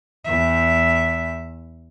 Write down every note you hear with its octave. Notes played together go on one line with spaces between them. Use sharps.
E2 E5